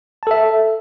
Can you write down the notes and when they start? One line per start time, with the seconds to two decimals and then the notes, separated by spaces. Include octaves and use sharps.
0.23 A5
0.27 A4
0.31 E5